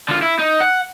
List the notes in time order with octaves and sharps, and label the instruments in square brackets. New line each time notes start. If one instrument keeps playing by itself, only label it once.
[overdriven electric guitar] D3 F4
E4
D#4
F#5